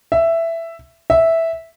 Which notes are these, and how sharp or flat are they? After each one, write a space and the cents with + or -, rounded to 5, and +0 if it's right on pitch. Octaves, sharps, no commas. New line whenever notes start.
E5 +10
E5 -5